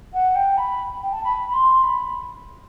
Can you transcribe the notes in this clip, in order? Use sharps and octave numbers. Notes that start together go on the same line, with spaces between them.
F#5
G5
B5
G5
A5
B5
B5
C6
B5